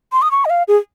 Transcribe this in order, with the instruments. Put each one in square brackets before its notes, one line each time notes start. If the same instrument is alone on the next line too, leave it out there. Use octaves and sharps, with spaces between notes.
[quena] C6
D#6
C#6
D#5
F5
G#4